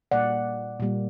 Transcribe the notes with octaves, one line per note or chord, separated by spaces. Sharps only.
A#2 G3 A#3 D5 F#5
A#2 G3 A#3